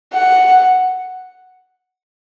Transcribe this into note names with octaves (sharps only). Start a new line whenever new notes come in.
F#5